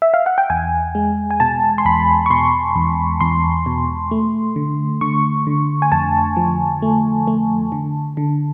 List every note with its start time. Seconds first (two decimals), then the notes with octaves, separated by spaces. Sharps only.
0.02 E5
0.14 F5
0.26 F#5
0.38 G5
0.50 E2 G#5
0.95 G#3
1.31 G#5
1.40 B2 A5
1.78 C6
1.85 E2 B5
2.26 C#6
2.30 B2 C6
2.76 E2
3.21 E2 C6
3.66 B2
4.11 A3
4.56 D3
5.01 D3 C#6
5.47 D3
5.82 G#5
5.92 F2 A5
6.36 F3
6.82 A3
7.27 A3
7.72 D3
8.17 D3